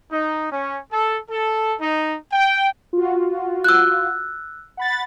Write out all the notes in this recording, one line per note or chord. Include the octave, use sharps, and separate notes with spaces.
D#4
C#4
A4
A4
D#4
G5
F4 F#4
E6 F#6
F#5 B5 A6